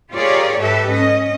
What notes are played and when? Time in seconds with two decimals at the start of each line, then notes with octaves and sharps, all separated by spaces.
0.13 F4 G4 G#4 A#4 C#5 D5
0.59 G#2 G4 A4 B4 E5
0.91 C#4 D#5